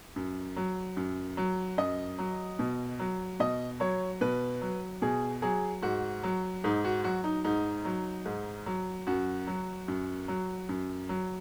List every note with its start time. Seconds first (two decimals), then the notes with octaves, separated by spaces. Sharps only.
0.16 F#2
0.56 F#3
0.97 F#2
1.37 F#3
1.78 F#2 D#5
2.18 F#3
2.59 B2
2.99 F#3
3.40 B2 D#5
3.80 F#3 C#5
4.21 B2 B4
4.61 F#3
5.02 B2 G#4
5.42 F#3 G#4
5.83 G#2 F#4
6.23 F#3
6.64 G#2 D#4
6.84 F#4
7.04 F#3 F#4
7.24 D#4
7.44 G#2 D#4
7.85 F#3
8.26 G#2
8.66 F#3
9.07 F#2 F#4
9.47 F#3
9.88 F#2
10.28 F#3
10.69 F#2
11.09 F#3